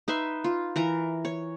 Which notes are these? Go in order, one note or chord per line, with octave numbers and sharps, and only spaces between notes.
D#4 B4 E5 C6
F4
E3 A#4 A#5
C#5